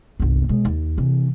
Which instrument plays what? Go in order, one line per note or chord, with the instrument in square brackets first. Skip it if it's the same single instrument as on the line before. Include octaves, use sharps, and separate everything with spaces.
[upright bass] G1 C2
B2 G#3
D#2
C3 E3